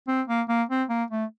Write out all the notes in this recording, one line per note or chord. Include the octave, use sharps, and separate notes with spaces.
C4
A#3
A#3
C4
A#3
A3